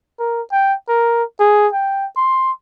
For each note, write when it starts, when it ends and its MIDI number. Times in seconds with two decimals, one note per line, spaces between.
0.19 0.42 70
0.52 0.74 79
0.89 1.23 70
1.40 1.68 68
1.73 2.06 79
2.16 2.52 84